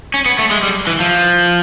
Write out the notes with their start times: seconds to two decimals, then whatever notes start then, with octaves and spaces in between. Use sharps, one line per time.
0.14 C#4
0.26 B3
0.39 A3
0.51 G#3
0.63 G3
0.87 E3
1.00 F3